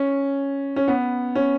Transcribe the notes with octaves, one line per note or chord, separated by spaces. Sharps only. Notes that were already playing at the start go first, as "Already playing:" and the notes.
Already playing: C#4
C#4
B3
C#4